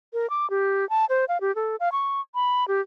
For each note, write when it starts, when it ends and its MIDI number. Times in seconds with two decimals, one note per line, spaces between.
0.13 0.29 70
0.30 0.49 86
0.50 0.88 67
0.90 1.05 81
1.09 1.25 72
1.28 1.38 77
1.41 1.54 67
1.55 1.76 69
1.80 1.89 77
1.92 2.21 85
2.35 2.67 83
2.68 2.81 67